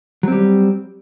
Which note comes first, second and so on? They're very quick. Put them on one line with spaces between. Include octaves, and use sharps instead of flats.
F#3 C4 G3